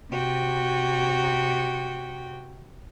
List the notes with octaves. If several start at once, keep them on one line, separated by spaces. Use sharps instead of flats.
C3 F#4 G5